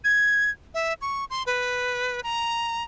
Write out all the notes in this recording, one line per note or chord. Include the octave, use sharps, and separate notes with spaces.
G#6
E5
C#6
C6
B4
A#5